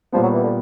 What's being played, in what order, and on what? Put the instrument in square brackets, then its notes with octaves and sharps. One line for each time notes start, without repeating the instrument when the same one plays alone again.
[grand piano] A#2 G3 B3 [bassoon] F3
[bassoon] F#3
E3
D3